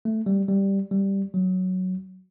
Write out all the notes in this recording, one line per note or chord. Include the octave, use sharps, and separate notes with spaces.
A3
G3
G3
G3
F#3